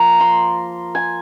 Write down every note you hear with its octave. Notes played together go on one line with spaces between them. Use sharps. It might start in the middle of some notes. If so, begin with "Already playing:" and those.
Already playing: F3 A#3 F4 A#5
C6
G#5